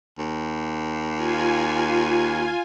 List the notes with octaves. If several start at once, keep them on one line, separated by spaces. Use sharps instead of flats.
D#2
F4 G#5